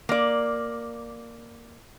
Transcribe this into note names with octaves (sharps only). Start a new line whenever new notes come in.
A#3 D5